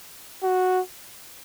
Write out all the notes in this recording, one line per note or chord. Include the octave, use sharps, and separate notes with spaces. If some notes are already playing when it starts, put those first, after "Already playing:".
F#4